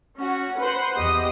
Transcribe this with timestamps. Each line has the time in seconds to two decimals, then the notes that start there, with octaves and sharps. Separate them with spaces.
0.17 C#4 F#4
0.59 B4 C5 F#5 C6
0.97 E2 G4 D#5 D#6